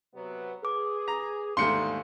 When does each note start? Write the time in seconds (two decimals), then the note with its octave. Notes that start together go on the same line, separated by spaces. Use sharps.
0.14 C3 F#3 B3
0.63 G#4 B4 D6
1.08 A#5
1.57 D#2 G#2 D3 G3 A3 C6 C#7